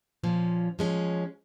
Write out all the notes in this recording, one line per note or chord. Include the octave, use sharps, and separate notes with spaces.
A#2 F3 C#4
F3 G#3 C#4